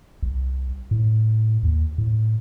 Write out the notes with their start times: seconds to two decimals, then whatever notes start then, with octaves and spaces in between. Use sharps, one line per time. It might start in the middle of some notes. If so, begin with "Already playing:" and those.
0.23 C2
0.91 A2
1.63 D#2
1.98 A2